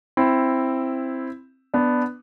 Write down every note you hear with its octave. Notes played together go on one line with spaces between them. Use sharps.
C4 E4
B3 D4